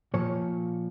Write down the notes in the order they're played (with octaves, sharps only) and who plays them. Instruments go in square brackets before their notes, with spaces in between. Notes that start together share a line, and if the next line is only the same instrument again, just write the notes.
[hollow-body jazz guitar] A#2 F3 C#5